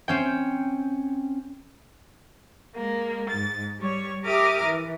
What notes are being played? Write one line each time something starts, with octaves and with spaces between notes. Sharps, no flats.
C4 C#4 G5
G#3 A#3
G#2 A6
G3 C#5
G4 A#4 E5 D6 D#6 F6
E3